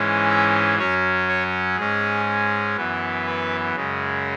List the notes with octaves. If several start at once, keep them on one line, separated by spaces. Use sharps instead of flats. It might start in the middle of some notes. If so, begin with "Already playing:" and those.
Already playing: G#2 E3 G#3 C#4
E5
F#2 F#3 C#4 C#5
C#5
G#2 G#3 C#4 G#4
F#2 E3 B3
B4
F#2 C#3 G#3